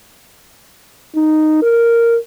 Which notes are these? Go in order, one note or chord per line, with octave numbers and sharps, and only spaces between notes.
D#4
A#4